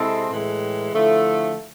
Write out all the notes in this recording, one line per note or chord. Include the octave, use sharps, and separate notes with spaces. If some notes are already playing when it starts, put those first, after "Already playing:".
Already playing: C3 G#3 C4 E4 A4
A2 E3 G#3
D3 F3 A3 E4